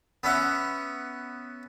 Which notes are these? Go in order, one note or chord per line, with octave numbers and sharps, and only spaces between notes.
B3 C#4 E5 F#5